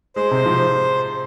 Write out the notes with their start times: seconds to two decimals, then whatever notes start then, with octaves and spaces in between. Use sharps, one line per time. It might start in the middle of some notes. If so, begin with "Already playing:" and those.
0.16 G#3 C5
0.31 C3
0.46 F3